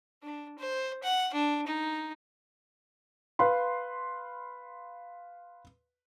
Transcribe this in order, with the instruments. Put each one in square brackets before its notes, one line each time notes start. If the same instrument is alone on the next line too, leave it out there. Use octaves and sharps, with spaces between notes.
[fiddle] D4
C5
F#5
D4
D#4
[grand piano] B4 F5 B5 C6